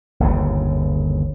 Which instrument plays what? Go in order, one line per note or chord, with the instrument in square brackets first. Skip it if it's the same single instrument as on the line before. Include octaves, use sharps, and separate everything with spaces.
[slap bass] G1 D#2 C#3